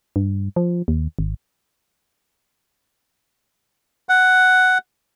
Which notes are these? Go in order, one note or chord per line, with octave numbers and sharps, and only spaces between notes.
G2
F3
D#2
G#1
F#5